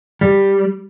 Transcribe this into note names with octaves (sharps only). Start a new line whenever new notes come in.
G3